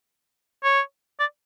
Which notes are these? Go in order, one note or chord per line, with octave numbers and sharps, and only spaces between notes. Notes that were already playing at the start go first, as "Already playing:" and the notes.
C#5
D5